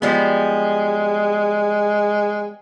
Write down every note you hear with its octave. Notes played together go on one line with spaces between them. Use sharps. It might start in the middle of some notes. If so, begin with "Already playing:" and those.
F3 G3 G#3 B3